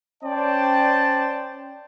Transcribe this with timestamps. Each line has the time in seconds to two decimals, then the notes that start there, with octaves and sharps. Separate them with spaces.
0.24 C#4 C5 D5 G5 A5